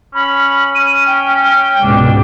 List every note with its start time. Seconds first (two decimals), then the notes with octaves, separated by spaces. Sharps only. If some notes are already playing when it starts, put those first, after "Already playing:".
0.15 C#4 B5
0.75 C#4 D#7
1.06 G5
1.82 C#2 G#2 B2 D4